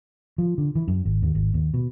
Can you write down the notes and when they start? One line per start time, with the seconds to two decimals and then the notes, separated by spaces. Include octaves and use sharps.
0.38 F3
0.58 D3
0.75 E3
0.88 F#2
1.05 G#1
1.23 D#2
1.35 G#1
1.54 D#2
1.74 B2